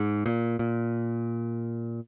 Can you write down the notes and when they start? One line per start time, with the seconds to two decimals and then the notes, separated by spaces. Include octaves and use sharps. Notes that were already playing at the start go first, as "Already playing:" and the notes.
Already playing: G#2
0.26 A#2
0.59 A#2